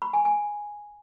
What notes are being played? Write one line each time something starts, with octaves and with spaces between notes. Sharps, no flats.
B5
G#5
G#5